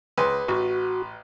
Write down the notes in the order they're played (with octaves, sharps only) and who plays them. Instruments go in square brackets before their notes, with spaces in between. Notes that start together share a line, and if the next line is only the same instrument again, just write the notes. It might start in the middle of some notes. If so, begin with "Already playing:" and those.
[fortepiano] C#2 [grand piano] B4 C6
[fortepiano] A1 [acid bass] F#4